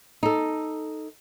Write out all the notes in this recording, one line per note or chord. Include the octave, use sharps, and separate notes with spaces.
D#4 A4